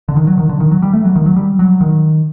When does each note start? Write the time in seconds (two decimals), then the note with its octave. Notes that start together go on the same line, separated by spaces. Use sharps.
0.09 D3
0.16 D#3
0.27 F#3
0.38 D#3
0.49 D3
0.60 D#3
0.71 F#3
0.82 G3
0.93 A3
1.04 F#3
1.16 D#3
1.26 F#3
1.36 G3
1.59 F#3
1.81 D#3